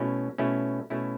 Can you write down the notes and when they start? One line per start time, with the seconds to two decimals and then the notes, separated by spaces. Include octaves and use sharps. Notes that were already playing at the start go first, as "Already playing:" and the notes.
Already playing: B2 A3 C#4 E4
0.38 B2 A3 C#4 E4
0.90 B2 A3 C#4 E4